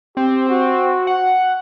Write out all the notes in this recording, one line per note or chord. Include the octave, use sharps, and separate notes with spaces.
C4 G4
F#4
F#5